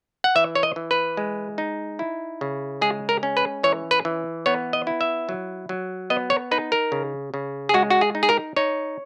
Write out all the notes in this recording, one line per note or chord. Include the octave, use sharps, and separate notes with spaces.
F#5
E3 E5
C#5
D#5
E3
B4
G#3
D#4
E4
C#3
G#3 G#4
A#4
C#4
B4
E3 C#5
B4
E3
B3 C#5
D#5
E4
E5
F#3
F#3
B3 D#5
C#5
D#4 B4
A#4
C#3
C#3
G#4
G#3 F#4
F#4
G#4
D#4
G#4
A#4
D#4 C#5